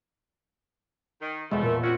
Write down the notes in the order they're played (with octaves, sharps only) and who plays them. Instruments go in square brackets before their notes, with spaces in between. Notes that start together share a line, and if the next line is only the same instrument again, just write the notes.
[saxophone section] D#3
[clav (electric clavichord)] E2 B2 [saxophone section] F3 A3 [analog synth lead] G#3
[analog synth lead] A#2 [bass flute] A#4
[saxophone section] C3 F#4 [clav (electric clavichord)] C4 C#4 [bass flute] F4